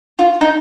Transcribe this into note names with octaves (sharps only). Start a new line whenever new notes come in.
F4
D#4